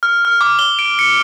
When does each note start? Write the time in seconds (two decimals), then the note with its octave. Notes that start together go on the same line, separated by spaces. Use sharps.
0.03 F6
0.25 F6
0.41 D6
0.59 G7
0.79 D7
0.99 C#7